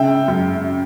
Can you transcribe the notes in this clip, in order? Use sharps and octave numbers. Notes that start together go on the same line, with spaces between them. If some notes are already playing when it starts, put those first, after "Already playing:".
Already playing: C#3 E5 G5
F#2